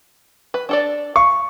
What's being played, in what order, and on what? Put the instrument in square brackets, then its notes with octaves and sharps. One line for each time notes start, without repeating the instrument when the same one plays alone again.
[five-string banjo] B4
D4 A4 D5
[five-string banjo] F5 [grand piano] C#6